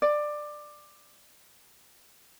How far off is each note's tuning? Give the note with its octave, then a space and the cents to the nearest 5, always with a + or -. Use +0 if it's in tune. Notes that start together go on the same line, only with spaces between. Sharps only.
D5 +15